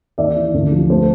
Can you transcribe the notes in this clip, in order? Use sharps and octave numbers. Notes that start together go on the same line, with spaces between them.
D#2 D5 E5
E3
D2
F3
A3 C5